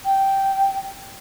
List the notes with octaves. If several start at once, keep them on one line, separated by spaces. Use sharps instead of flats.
G5